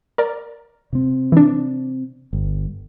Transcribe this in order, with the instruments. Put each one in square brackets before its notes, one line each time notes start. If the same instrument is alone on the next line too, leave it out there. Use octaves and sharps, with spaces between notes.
[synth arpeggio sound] A#4 D5
[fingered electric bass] C3 C4
[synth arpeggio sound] E3 D4
[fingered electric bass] G1